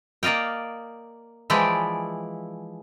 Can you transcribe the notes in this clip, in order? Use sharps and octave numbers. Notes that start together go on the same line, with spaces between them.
A#3 D5 D#5 F5 G5
E3 F3 G#3 E4 D5 G5